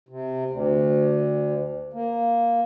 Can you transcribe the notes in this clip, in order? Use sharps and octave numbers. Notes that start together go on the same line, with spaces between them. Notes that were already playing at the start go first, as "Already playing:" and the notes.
C3
D2
A#3